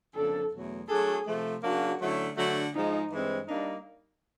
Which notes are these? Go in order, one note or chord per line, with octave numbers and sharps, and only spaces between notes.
F2 C#3 F3 A#3 D4 A4
E2 B2 F#3 A3
F#3 A3 D4 F#4 G#4 A4
C3 F3 A3
C#3 F#3 A#3 D4 F#4
D3 F#3 A3 C#4 E4
D3 F#3 A3 D4 F#4
G#2 F3 G#3 D#4
G2 E3 G#3 C4
G3 A#3 D4 D#4